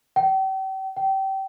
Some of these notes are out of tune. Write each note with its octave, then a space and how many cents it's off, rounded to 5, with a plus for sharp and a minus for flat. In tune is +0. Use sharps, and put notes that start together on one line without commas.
G5 -40
G5 -25